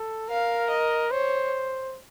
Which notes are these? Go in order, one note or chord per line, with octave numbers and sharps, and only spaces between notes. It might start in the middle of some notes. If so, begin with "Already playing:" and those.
Already playing: A4
A#4 F5
D#5
C5 C#5